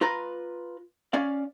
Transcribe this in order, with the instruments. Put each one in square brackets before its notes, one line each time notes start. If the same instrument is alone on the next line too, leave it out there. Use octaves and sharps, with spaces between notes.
[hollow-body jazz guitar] F4 B4 A#5
C#4 D5 F5